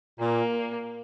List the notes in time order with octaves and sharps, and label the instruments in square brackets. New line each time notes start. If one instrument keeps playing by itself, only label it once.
[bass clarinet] A#2 [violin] A#3